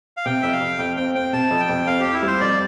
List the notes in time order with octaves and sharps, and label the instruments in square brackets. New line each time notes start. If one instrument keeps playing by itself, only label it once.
[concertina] F5
[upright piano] C3 [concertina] G5
[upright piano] F2 [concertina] E5
[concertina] F5
[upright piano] F2
[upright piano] F2 [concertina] G5
[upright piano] C4 [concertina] G5
[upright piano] C4 [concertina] G5
[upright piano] C3 [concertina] A5
[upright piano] F2
[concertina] G5
[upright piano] F2
[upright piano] C4 [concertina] F5
[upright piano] C4 [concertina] G4
[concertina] E4
[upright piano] G3 [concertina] C5
[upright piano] F2 [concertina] D5